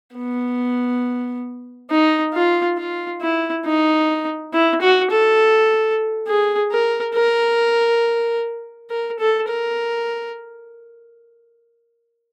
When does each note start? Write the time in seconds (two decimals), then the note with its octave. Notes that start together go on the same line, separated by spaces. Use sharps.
0.16 B3
1.90 D#4
2.34 F4
2.78 F4
3.21 E4
3.66 D#4
4.53 E4
4.82 F#4
5.11 A4
6.28 G#4
6.72 A#4
7.15 A#4
8.90 A#4
9.19 A4
9.48 A#4